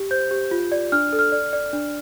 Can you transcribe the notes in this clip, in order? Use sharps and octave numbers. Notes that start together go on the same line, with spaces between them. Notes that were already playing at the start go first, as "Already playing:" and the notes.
Already playing: G4
C5 G6
G4
F4
D5
D4 F6
A4
F6
D5
D5
D4